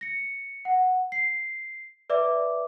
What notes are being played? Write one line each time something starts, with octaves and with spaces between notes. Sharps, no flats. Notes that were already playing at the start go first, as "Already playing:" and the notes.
A#6 C#7
F#5
C7
B4 D5 E5 D6